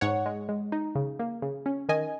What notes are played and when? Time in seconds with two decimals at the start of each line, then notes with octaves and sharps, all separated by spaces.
0.01 G#2 C#5 F#5
0.26 G#3
0.49 G#3
0.72 D#4
0.95 C#3
1.19 A#3
1.42 C#3
1.66 C#4
1.89 D#3 D#5 G#5